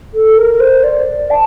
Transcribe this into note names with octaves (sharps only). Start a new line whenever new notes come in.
A4
A#4
C5
D5
A5